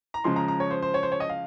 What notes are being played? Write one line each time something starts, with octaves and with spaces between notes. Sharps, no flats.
A#5
C#3 F3 G#3 C6
A#5
A#5
C#5
C5
C5
C#5
C5
C#5
D#5
F5